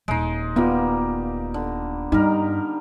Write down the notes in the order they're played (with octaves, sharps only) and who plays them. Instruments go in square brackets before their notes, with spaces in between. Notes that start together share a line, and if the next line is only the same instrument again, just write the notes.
[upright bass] D#1 [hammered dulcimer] G#3 D#4
[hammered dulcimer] G3 A#3 [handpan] B3 F4
[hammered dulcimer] D3
[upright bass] G2 [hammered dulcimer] G3 A#4 [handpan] D#4